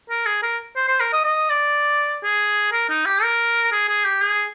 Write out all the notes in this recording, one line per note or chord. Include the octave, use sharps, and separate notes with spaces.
A#4
G#4
A#4
C5
C5
A#4
D#5
D#5
D5
G#4
A#4
D#4
G4
A#4
G#4
G#4
G4
G#4